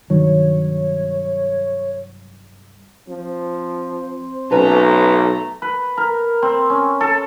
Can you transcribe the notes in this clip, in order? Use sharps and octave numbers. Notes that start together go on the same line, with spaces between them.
C2 G2 D#3 F#3 C#5
F3 C4 C5
B1 A3 C#4 B4 A5 A#5
B4
A#4
C4
C#4
A4